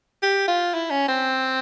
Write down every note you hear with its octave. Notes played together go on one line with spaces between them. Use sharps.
G4
F4
E4
C#4
C4